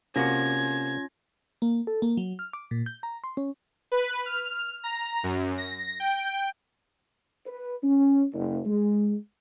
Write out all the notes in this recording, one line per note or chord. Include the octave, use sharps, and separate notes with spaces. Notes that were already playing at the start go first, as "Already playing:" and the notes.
C3 A#3 C#4 F4 F#4 G#6 A#6
A#3
A4
A#3
F#3
F6
D6
A#2
G6
A#5
C6
C#4
B4
F6
A#5
F#2
A#6
G5
B4
C#4
F#1
G#3